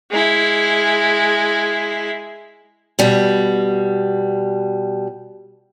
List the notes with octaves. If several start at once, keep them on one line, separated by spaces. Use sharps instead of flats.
G#3 E4
B2 G3